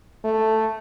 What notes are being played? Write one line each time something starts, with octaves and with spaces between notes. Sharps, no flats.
A3